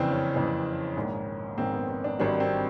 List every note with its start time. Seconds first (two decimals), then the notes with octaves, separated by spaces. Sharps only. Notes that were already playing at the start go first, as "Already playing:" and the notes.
Already playing: F#1 F2 C#3 E3 C4 D4
0.13 C#4
0.34 F#1 F2 C#3 E3
0.96 A#1 G#2 D#3
1.58 A#1 G#2 D#3 C4
1.73 B3
1.88 C4
2.04 D4
2.19 G#1 G2 D#3 F#3 D4
2.40 C4